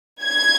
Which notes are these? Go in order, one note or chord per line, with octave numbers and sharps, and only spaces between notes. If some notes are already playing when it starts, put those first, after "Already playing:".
G#6